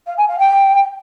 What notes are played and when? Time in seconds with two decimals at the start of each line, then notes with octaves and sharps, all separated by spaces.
0.07 F5
0.17 G#5
0.28 F5
0.39 G5